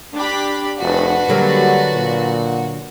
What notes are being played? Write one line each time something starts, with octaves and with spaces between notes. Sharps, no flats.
D4 G4 B5
F1 D4 F#4 B4
D3 F#3 G3 A#3
A#2